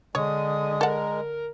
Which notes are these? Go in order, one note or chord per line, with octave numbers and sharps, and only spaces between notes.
D3 G#3 C#5 D#6
A4 A#4 F#5